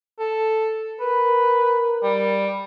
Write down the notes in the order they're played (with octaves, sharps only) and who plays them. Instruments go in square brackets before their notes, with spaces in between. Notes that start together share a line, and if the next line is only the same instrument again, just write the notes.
[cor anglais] A4
[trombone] A#4 [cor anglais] B4
[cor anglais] G3